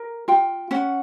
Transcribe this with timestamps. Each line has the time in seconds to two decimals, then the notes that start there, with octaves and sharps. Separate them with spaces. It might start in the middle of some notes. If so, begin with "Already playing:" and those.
Already playing: A#4
0.28 F4 G5
0.71 C#4 F#5